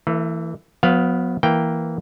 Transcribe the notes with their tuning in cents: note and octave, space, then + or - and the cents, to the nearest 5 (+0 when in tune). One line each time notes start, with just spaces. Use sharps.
E3 +0 A3 +45
F#3 -45 B3 +0 F5 +0
E3 +0 A#3 +0 G5 +0